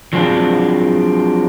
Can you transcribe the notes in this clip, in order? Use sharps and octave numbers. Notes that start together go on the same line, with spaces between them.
F3 F#3 G#3 C4 D4